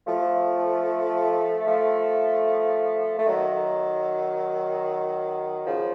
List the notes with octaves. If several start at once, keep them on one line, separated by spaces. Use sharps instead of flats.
F3 A3
F3 A3
A3
D#3 F#3
C#3 F3